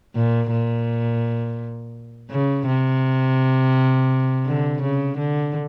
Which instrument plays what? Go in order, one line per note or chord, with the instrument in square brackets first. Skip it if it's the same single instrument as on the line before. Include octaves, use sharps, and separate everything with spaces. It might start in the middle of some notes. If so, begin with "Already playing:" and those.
[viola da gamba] A#2
A#2
C#3
C3
D3
C#3
D3